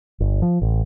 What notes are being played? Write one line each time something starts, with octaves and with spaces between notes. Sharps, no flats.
G1
F3
A1